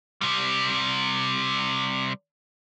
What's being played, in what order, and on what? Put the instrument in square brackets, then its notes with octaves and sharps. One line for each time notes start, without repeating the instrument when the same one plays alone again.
[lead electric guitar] C3 G3